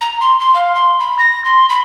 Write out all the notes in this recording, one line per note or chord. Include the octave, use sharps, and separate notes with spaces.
A#5
C6
C6
F5
C6
B5
A#6
C6
B5